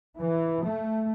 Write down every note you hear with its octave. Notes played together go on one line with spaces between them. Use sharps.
E3
A3